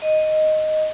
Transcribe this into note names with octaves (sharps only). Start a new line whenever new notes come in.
D#5